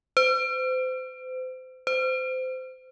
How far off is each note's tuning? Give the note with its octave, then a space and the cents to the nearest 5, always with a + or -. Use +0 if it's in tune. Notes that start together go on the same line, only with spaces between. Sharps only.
C5 -35
C5 -25